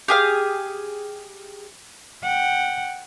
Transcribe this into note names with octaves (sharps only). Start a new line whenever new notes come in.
G4 G#4 F5
F#5 G5